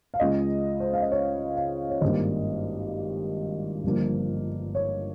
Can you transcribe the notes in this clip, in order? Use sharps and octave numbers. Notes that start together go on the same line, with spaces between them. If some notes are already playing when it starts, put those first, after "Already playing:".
F5
C#2 C#3 G#3 D#5
C5
F5
D#5
C#5
F5
C#5
G#1 G2 G3 A#3 D#5
G1 G2 F3 A#3
C#5